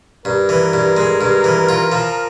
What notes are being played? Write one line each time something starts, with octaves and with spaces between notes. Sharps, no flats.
G2 A#4
E3
G2
G#3
G2
E3
F4
F3